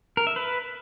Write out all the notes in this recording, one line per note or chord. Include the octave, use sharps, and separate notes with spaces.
A#4
E5
B4